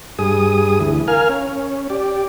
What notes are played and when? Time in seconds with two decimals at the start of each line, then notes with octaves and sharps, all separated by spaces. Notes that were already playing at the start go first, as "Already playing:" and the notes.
0.19 G2 G#4 D#6
0.80 D2 E3
1.08 A#4 F5 G#5 F6
1.29 C#4
1.90 G4 D5